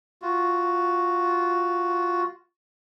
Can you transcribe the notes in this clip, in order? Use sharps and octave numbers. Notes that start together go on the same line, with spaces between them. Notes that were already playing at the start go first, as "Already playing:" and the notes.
F4 F#4